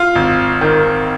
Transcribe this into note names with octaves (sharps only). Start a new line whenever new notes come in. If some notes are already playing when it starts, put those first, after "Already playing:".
Already playing: F4
G#1
D#3